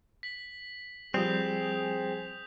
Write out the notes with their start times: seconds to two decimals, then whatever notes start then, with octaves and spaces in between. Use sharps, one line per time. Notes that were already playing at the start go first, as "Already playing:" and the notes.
0.23 B6 F#7
1.14 F3 G3 C4 G#4 D#6 G6 F7